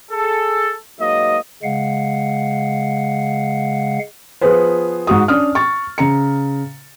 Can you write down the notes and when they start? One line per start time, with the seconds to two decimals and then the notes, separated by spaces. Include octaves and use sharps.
0.11 G#4 A4
1.00 G#2 F#3 A#3 D#5
1.63 C#3 G#3 F5 F#5
4.41 F3 B3 F4 G#4 B4 C5
5.07 G#2 F#4 D#6
5.28 C#4 D4 D#6 F6
5.55 C#6 A6
5.98 C#3 A#5 C#7